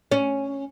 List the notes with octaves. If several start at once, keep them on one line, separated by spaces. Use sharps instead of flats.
C#4